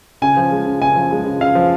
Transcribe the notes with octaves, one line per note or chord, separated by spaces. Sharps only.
C#3 G#5
F3
G#3
C#3
C#3 G#5
F3
G#3
C#3
C#3 F5
F3